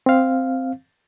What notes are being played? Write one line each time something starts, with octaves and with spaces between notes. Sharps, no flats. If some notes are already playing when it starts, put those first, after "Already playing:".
C4 F5